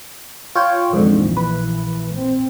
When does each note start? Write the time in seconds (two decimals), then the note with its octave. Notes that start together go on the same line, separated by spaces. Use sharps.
0.55 F4 C#5 G5
0.93 A#1 F2 G#2 D3 E3
1.37 B4
2.13 C4